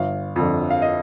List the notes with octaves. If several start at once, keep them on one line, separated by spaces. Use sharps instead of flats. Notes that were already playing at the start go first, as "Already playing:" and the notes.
Already playing: G1 F5
F2 D3
F5
D#5